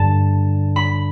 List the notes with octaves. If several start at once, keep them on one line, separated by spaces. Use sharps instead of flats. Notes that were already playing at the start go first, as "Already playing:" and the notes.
Already playing: G2 D3 A5
B5